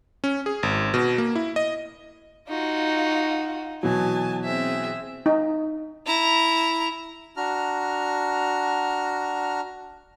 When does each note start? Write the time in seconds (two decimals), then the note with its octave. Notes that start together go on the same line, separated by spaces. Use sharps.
0.24 C#4
0.46 G#4
0.63 G#1
0.94 B2
1.18 A#3
1.36 E4
1.56 D#5
2.49 D#4 F4 F#4
3.83 B2 E3 F#3 G#5 A5
4.45 C4 G#4 E5
5.26 D#4
6.06 E4 A#5
7.37 D4 F#4 A#5 F6